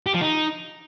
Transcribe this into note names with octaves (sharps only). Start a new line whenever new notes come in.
G4
F3
D#4